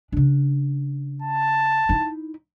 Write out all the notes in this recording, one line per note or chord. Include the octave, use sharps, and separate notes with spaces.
C#3 D4
A5
D#4 E4